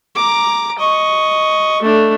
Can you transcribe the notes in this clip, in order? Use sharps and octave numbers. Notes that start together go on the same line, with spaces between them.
A#5 D6
D#5 C#6
A3 D4